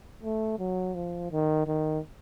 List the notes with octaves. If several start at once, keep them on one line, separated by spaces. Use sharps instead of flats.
A3
F#3
F3
D#3
D#3